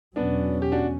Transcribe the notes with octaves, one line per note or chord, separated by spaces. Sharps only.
E2 B2 F#3 B3 C#4 D4
G4
D4 F#4